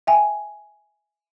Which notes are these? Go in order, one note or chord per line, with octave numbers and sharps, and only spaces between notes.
E5 G5 G#5